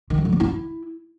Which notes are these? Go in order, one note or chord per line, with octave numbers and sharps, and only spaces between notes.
D#3
F#3
D3
A#3
E4